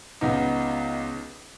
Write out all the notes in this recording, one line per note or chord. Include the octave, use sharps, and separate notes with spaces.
C#2 B3 D#4